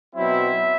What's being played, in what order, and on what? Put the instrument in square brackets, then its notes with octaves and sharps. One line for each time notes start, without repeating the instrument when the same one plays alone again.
[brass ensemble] B2 F#3 C4 E4 E5